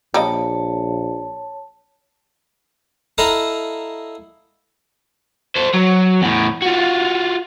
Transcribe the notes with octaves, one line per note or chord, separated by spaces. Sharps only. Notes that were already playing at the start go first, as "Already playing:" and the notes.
A#1 G3 A#3 C#5 D#5 A5
E4 A4 D#5 F5 F#5 A#5
A4 C5
F#3
E2 A2
F4 F#4